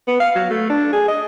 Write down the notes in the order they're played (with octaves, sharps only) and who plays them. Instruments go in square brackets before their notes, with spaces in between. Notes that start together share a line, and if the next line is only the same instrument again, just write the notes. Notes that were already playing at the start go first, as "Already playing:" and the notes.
[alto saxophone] B3
F5
F#3
A3
D4
G#4
D#5